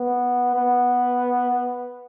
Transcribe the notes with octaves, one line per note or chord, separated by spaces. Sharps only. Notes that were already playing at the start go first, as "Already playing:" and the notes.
Already playing: B3
B3